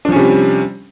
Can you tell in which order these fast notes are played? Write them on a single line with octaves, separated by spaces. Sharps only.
D4 F3 C#4 C3 G3